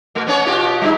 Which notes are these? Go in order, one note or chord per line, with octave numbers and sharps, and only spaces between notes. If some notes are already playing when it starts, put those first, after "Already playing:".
B2 A3
B3 C#4 C#5
B2 F4 G4
G3 D4 D#4